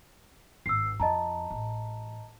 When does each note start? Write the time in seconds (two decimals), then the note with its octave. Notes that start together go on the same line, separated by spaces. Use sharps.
0.66 G#1 E6 C7
1.00 F2 D#5 A5 A#5
1.51 A1